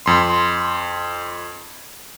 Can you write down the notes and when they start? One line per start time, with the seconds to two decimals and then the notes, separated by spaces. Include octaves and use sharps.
0.06 F2 C6